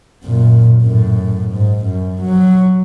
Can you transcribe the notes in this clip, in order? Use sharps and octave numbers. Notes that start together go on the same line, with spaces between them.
F#2 A#2
F#2 A2
G#2
F#2
F#3